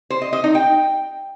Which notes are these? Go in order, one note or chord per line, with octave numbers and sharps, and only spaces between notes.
C5
D#5
D#5
D#4
G5